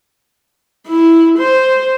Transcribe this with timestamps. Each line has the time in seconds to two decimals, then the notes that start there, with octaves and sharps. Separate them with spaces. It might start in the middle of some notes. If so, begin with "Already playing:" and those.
0.88 E4
1.39 C5